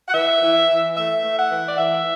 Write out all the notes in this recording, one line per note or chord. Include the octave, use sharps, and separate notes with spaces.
F#5
E3 E5
E3
E3
A3 E5
A3
F#5
E3
D5
E3 E5